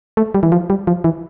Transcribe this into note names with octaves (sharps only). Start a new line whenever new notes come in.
A3
G3
E3
F3
G3
F3
E3